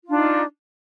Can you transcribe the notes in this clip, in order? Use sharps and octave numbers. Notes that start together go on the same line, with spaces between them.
D4 D#4 F4